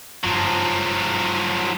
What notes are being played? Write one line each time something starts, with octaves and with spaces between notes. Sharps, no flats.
F#1 G2 F3 F#3